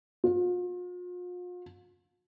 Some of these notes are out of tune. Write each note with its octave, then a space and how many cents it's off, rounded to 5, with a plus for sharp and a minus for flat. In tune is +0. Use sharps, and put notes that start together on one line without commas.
F4 +40